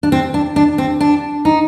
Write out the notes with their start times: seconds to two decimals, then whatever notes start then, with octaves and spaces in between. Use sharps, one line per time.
0.03 D4
0.12 C4
0.34 D4
0.56 D4
0.78 C4
1.00 D4
1.45 D#4